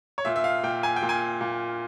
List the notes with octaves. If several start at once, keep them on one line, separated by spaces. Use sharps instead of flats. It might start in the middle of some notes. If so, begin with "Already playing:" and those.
C#5
A#2 E5
E5
F5
A#2 G5
G#5
G5
A#2
G#5
A#2